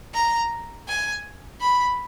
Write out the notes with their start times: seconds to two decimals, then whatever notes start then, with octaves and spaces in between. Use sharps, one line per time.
0.14 A#5
0.88 G#5
1.61 B5